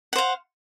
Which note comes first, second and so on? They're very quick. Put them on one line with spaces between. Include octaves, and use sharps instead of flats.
F#5 C5 F5